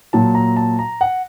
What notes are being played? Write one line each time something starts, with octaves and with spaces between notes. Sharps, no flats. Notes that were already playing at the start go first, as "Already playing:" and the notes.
A#2 F#3 A5
A#5
A5
A#5
F#5